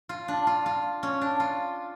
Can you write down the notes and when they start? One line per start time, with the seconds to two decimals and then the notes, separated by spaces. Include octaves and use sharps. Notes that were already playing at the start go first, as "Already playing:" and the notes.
0.09 F4
0.28 D4
0.47 F4
0.66 F4
1.03 C#4
1.21 D4
1.40 F4